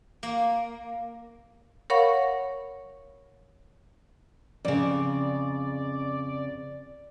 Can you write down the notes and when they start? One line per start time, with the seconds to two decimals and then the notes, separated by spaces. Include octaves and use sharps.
0.23 A#3
1.90 A#4 C#5 F5 F#5 B5 C#6
4.65 F2 C#3 D5